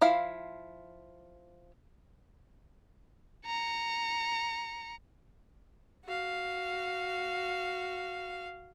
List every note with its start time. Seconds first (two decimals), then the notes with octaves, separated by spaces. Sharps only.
0.01 F3 E4 F5
3.47 A#5 C#7
6.05 F#4 F5